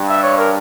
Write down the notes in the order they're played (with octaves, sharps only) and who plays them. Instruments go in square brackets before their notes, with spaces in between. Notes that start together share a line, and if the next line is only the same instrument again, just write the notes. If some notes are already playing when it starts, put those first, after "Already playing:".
Already playing: [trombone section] G2
[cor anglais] E5
C#5
A#4